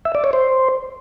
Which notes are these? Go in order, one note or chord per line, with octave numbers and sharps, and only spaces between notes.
E5
D5
C#5
C5